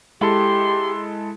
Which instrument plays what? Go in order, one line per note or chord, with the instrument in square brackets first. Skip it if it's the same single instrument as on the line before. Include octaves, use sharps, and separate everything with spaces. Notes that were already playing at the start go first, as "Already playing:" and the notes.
[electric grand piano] G#3 E4 A4 [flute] G4 [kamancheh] C6